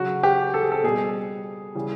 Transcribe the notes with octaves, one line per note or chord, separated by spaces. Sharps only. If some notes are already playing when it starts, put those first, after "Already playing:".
Already playing: C#3 F#3 F#4
G4
A4
G#4
A4
B2 G3 G#4
C#3 E3 G3